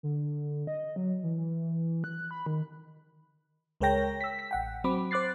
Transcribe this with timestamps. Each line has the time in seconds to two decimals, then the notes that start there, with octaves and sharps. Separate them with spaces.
0.03 D3
0.67 D#5
0.96 F#3
1.23 E3
1.38 E3
2.04 F#6
2.31 B5
2.46 D#3
3.81 C#2 G#3 A#4 C#5 G5 A#6
4.21 E6 B6
4.39 B6
4.51 A1 F#5 G5
4.84 F#3 C4 B5 D6
5.11 C5 D6 F#6 A6 C7